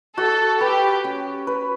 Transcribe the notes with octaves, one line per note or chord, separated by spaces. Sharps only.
F#4 A4
G4 B4
C#4
B4